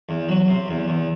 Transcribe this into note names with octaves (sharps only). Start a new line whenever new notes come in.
E2
F#3
C3
E2
E2